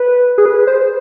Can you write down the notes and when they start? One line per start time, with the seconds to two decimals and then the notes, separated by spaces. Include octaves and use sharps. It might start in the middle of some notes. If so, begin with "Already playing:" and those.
Already playing: B4
0.38 G#4
0.46 B4
0.67 C5